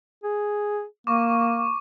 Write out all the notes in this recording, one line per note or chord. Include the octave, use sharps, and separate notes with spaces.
G#4
A#3 C#6 D6